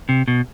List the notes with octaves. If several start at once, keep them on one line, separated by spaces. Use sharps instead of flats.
C3
B2